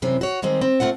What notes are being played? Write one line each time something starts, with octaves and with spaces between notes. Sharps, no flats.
F#2 C3 E3 C4
F#4 C#5
D#3 G3 G#3 C4
C4
A3 C4 F4 F#5